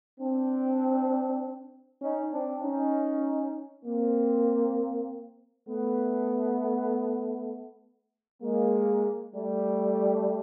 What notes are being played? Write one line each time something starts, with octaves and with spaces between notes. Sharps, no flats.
C4 D4
C#4 D#4
C4 D4
C#4 D#4
A#3 C4
A3 B3
G#3 A#3
G3 A3